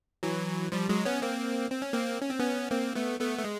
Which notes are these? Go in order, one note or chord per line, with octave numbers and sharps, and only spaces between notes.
E3 F#3
F3 G3
F#3 G#3
B3 C#4
A#3 C4
C4
C#4
A#3 C4
C#4
C4
B3 C#4
A#3 C4
A3 B3
A3 B3
A3
G#3